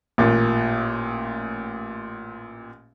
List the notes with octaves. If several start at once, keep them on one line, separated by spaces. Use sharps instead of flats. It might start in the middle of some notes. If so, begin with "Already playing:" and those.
A1 A#2